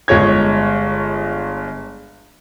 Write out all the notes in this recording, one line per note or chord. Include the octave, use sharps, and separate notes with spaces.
G1 G#3 C#5 G#6